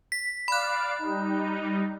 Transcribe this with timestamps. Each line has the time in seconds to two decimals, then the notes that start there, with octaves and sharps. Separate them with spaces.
0.12 B6
0.48 D5 F5 B5 F#6
0.99 G3 D#4